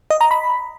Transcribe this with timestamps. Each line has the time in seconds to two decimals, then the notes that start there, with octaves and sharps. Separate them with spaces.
0.10 D#5
0.21 A#5
0.31 B5